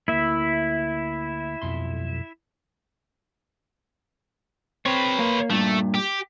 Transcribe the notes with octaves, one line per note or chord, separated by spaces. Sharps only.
D2 A#3 E4 E5
B1 F2 C6
C4 B4 C#5
A#3
G2 A#2 A3
G4